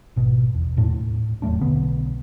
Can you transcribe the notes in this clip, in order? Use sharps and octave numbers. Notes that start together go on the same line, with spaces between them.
G#1 B2
E2
D#1 A2 D4
E1 F#3 A3 D4
B1 D3 B3